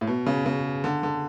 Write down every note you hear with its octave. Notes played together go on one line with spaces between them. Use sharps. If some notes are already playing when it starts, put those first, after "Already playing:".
A2
B2
C#3
C#3
D3
D3